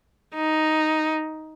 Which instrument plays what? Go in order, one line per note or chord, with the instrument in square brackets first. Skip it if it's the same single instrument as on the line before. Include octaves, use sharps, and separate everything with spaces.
[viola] D#4